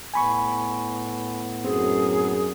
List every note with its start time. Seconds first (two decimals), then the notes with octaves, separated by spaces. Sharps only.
0.14 A2 B3 G#5 B5 C#6
1.65 F#2 C4 G#4